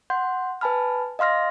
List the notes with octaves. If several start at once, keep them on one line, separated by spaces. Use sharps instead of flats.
F#5 C6 G6
B4 G#5 A5 B5 F6
D#5 F5 C6 F6 A#6